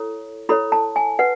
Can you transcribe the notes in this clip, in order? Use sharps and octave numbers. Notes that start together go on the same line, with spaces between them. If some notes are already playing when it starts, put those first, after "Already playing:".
Already playing: E4 A4 C#5
E4 A4 C#5 B5
A5
G#5
B4 F#5